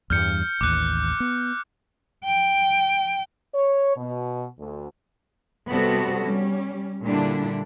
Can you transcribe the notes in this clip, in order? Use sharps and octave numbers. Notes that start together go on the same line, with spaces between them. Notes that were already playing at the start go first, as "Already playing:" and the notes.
E2 G2 G3 F6 G6 C#7
A1 D#2 D6 F#6
B3
G5
C#5
B2
D2
C3 G3 B3 C4 F#4 A4
G3 C#4
A#2 D3 G3 D4 E4